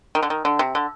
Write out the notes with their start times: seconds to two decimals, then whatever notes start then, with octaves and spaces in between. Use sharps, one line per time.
0.15 D#3
0.23 D3
0.30 D#3
0.45 D3
0.59 C3
0.75 D3